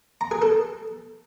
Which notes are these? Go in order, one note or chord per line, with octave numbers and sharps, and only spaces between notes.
A#5
G#4
A4